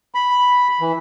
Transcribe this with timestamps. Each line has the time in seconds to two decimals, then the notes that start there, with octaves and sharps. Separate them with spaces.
0.15 B5
0.81 E3